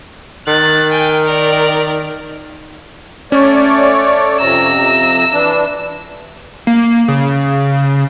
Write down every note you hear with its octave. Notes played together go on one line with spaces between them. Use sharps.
D#3 F#6 A6
G5 G#5
A#4 D5
A3 C#4 C#5 D5
F2 C3 A#5 E6
E3 D4
A#3
C#3